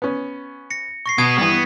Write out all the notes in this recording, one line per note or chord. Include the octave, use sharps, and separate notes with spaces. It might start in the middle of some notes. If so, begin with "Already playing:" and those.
B3 C#4
A#6 C#7
C#6 A#6 C7
B2 B3 D#6 G#6 D#7
G2 E3 B3